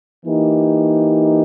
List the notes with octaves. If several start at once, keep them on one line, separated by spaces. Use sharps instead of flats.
E3 A#3 D#4 G4